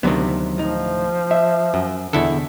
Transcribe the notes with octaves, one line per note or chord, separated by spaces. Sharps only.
D2 C3 D#3 F3 F#3 B3
A2 F3 D#4
E5
F#2
E2 B2 D3 E4 A4